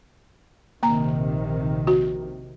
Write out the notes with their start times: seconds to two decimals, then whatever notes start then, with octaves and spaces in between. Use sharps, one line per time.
0.83 A#1 C3 D#3 A#3 A#5
1.87 F#4